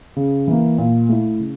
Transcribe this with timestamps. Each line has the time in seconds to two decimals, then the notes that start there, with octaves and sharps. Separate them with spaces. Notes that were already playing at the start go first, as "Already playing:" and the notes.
0.16 C#3
0.47 E3 A#3
0.78 A#2
1.09 A3 E4
1.40 C#3